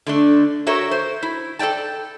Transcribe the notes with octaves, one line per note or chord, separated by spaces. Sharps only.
D3 A3 D4
F#4 A4 A#4 C#5 E5
C5
E4
A4 A#4 D5 G5 A5